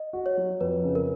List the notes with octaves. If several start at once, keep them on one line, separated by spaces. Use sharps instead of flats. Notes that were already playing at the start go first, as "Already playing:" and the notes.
Already playing: D#5
F#4
C#5
F#3
F2 B4
C#3
A#4